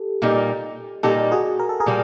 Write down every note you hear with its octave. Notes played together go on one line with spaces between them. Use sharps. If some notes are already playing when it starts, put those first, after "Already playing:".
Already playing: G4 A4
A#2 G3 A#3 D#4
A#2 G3 A#3 D#4 G4 A4
F#4 G#4
A#4
A4
G#4 A#4
A#2 G3 A#3